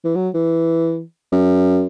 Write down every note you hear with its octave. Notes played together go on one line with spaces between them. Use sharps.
E3
F#3
E3
F#2